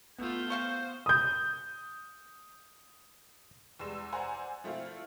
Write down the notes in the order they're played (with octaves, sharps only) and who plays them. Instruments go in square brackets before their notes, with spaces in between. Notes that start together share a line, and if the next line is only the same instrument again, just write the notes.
[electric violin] A3 F4 [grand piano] B3 [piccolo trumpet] G6
[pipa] C4 F5 C#6 [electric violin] C5
[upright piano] D#6 G6
[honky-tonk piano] E2 G3 G#3 E6 E7
C5 D5 F#5 G#5 A#5 C6
F3 A3 C4 E4 F4